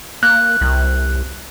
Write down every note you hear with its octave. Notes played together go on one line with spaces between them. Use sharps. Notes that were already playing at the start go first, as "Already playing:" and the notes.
A#3 F#6
C2